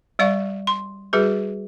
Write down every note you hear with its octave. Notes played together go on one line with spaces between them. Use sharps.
G3 D5 F5 C#6
C6
G3 F#4 G#4 B4